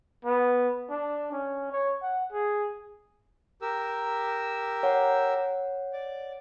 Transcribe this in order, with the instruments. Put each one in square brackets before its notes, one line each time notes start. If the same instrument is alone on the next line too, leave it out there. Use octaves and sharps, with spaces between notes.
[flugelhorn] B3
D4
C#4
C#5
F#5
G#4
[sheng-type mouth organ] G4 A#4 E6
[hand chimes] C#5 F#5
[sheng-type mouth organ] D5